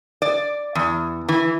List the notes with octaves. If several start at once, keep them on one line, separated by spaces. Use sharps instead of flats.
D5
E2
E3